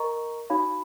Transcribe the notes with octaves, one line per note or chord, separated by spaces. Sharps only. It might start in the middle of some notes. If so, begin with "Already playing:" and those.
Already playing: A#4 D#5 A#5 C#6
D#4 F#4 C#5 F5 B5